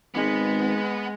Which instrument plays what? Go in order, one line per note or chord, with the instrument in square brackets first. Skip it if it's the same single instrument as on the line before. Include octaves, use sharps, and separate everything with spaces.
[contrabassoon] G#1 [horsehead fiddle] G#3 [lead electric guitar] B3